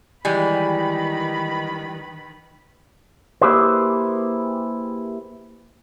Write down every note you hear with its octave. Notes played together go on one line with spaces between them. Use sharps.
D#3 E3 G3 G#3 B4 B5
A#3 E4 G4 G#4 B4 C5